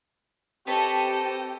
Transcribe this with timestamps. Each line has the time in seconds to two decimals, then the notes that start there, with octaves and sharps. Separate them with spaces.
0.67 C4 G4 A4 B4 C#5 D#5 A5